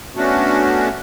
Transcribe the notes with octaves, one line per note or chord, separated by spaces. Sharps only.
A3 B3 C#4 D4 F#4